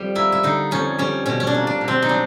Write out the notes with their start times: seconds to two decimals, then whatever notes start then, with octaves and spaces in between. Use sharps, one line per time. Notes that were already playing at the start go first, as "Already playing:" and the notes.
Already playing: F2 G3
0.15 A#3 E4
0.32 E4
0.43 D3 D#4
0.71 F2 C#4
0.99 G3 C#4
1.26 B2 C#4
1.40 C#4
1.47 D4
1.54 A#3
1.67 D4
1.81 B2
1.88 C4
2.02 D#4
2.09 F#3 D4